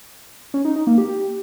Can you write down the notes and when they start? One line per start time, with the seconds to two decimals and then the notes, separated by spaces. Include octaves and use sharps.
0.54 C#4
0.65 D#4
0.76 D#4
0.87 A#3
0.98 G4